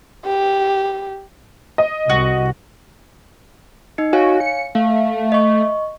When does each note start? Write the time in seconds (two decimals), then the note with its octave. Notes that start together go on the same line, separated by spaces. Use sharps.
0.24 G4
1.78 D#5
2.10 C2 F#4
3.98 D#4 D#5 C#7
4.13 F#4 C#5 F5 G#5
4.40 C#7
4.75 A3 F5
5.32 D#5 C#6